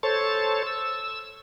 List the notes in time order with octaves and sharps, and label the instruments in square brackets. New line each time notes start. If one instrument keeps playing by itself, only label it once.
[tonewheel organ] A4 C5 C#5 A6
E6